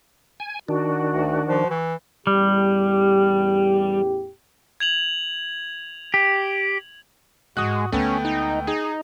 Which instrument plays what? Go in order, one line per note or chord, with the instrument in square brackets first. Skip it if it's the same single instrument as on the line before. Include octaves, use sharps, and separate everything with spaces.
[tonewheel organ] G#5
[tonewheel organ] D#3 D4 [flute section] F#4
[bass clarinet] D2
F3
E3
[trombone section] A1 E2 G4 [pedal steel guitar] G3
[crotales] G#6 F7 F#7
[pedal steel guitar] G4
[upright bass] G#2 [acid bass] G#3 [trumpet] F#4 [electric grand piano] D#6 F#6
[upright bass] D2 G#3 [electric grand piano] A3 B3 [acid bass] C#4 [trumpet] G5
[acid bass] D#4
[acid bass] D#4 [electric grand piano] G#4